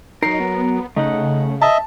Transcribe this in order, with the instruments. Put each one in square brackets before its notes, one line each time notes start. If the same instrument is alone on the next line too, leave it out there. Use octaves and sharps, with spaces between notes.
[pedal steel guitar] F#3 A#4 [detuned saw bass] D#4 [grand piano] C7
[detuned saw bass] B3
[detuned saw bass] C#3 [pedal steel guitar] A3 F#5 [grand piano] D#4
[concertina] D#5 E5 [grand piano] A5